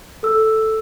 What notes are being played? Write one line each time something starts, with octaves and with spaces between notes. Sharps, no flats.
A4 E6